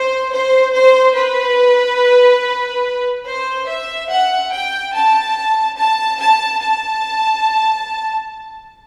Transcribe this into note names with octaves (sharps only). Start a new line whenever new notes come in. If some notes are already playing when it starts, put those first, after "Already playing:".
Already playing: C5
C5
C5
B4
C5
E5
F#5
G5
A5
A5
A5
A5